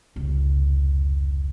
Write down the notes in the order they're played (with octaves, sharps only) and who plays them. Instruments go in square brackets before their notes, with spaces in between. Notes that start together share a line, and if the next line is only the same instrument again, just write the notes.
[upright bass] F1 C#2